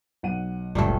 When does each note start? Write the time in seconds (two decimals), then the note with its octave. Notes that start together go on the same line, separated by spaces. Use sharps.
0.23 B1 F#5 D#7
0.75 F#1 C#2 A#2 G3 A3